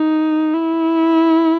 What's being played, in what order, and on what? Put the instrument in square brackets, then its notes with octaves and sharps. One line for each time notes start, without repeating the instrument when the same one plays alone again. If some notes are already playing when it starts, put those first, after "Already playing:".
Already playing: [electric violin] D#4
E4